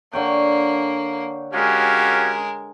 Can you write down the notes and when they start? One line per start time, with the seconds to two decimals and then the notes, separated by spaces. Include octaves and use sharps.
0.13 D3 A#3 C#5 G5
1.53 G#3 C#4 F#4 G4 A#4 F5